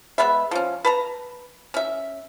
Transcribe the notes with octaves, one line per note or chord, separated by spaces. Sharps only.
G#3 B3 B4 E5
F3 C#4
B4 A5 A#5
C#4 E5